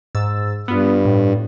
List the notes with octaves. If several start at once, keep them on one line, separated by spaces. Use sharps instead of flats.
G#2 E6 A6
G2 B3 F4
A2